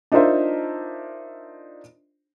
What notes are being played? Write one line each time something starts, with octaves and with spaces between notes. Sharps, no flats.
D4 D#4 F4 A#4 C5 E5